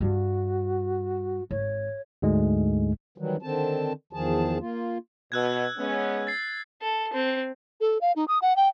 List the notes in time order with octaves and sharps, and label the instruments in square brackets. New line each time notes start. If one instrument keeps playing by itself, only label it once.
[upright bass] G2 G3 [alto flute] F#4
[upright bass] G#1 [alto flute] C#5
[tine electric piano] D2 G#2 G#3
[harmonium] D#3 E3 F#3 G3
D3 D#3 C4 A5
E2 D#3 F3 G#4 A5
A#3 F4
[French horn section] B2 [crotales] E6 F#6 G#6
[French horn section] G#3 B3 C#4
[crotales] A6 C7
[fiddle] A4
C4
[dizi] A4
F5
D#4
D#6
F#5
G5